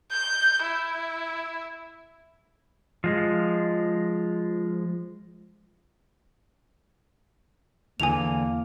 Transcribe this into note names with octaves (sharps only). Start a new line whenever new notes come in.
G6
E4
F3 G#3
E2 D3 E3 A#3 G#5 F7